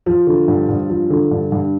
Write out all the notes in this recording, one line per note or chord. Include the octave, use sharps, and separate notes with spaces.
F3
D3
G2
G2
F3
D3
G2
G2